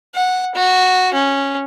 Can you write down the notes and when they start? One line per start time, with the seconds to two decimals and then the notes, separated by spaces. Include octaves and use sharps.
0.15 F#5
0.55 F#4
1.13 C#4